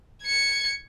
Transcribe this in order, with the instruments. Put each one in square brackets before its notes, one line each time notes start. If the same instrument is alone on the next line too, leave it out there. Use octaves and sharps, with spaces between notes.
[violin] G#6 C#7